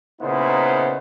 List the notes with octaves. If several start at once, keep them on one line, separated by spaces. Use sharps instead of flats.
A#2 C#3 B3 D#4 E4 C5